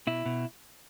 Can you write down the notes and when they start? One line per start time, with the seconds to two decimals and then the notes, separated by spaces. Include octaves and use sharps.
0.07 B2 E4
0.26 B2